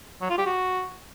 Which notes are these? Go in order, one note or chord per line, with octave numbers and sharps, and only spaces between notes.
F#3
F4
G4
F#4